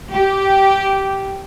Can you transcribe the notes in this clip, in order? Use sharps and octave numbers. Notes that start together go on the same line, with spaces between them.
G4